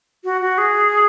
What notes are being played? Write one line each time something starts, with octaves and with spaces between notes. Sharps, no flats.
F#4
F#4
G#4